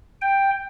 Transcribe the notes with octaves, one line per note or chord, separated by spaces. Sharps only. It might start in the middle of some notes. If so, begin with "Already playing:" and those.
G5